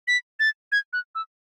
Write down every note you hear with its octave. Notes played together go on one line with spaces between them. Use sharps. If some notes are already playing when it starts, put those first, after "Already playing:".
B6
A6
G#6
F#6
E6